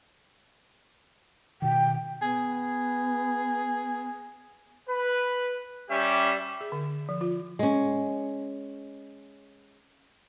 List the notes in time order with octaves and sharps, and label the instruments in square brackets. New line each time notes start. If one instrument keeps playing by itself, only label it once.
[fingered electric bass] B2 D#3 [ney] G5
[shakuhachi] B3 [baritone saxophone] G#4
[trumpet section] B4
G3 C#4 G4 E5
[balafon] G#4
D3
F3
F4
[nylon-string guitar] G#3 C#4